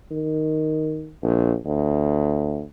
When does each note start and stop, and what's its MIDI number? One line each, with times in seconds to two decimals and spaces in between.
0.11 1.12 51
1.23 1.55 34
1.65 2.62 38